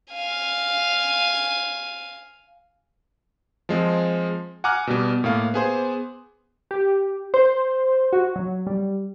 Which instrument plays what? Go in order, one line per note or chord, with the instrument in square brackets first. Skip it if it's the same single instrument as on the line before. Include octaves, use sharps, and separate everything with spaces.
[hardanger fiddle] F5 G#5
[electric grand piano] F3 G#3 C4
F#5 G#5 A#5 D6 F6 F#6
B2 G3 B3
A2 A#3 F5
B3 G#4 C5
[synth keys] G4
C5
F#4
F#3
G3